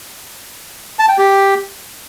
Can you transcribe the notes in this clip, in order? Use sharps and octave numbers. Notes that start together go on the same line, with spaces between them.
A5
G5
G4